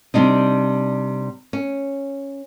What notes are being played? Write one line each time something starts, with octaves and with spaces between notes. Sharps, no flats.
C3 G3 D4 D#4
C#4